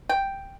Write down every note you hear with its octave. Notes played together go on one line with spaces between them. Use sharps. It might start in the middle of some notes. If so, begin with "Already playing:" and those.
G5